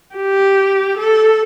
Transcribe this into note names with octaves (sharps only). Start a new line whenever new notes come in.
G4
A4